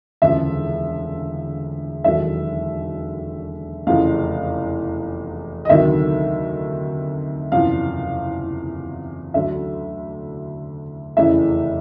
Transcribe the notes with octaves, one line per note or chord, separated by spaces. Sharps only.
E1 D2 C#3 F3 E5
E1 D#2 D3 F#3 E5
F1 E2 C#3 F3 F5
D#5
D2 C3 D#3 F#3 E5
F#1 E2 C3 F3 F5
D2 D3 F#3 E5
F1 E2 C#3 E3 E5